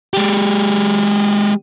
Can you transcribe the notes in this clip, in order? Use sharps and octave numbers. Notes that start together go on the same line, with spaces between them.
G#3 G4